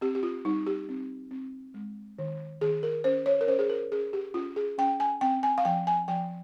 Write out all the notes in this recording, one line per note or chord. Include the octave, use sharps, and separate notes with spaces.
C4 G4
G4
F4
G3 D#4
G4
C4
C4
G#3
D#3
D#3 G#4
A#4
C#4 C5
C#5
A#4
C#4 C5
G#4
A#4
C#4 G#4
G4
C#4 F4
G#4
C#4 G5
G#5
C4 G5
G#5
F5
F3 G5
G#5
F3 G5